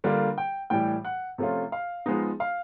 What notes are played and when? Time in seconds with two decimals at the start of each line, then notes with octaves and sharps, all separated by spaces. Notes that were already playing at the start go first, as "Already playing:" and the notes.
0.04 D3 G3 A#3 D4 F4
0.38 G5
0.70 A2 E3 G3 G5
1.05 F#5
1.38 C3 F3 A3 C#4 F4
1.72 F5
2.06 F3 G#3 B3 D#4
2.40 F5